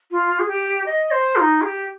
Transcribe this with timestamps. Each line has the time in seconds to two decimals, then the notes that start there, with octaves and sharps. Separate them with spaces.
0.11 F4
0.39 G#4
0.48 G4
0.86 D#5
1.11 C5
1.36 F4
1.41 D#4
1.61 G#4
1.65 G4